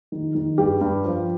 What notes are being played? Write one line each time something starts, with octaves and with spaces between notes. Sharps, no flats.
D#3
D#3
G2 G4
G2
F3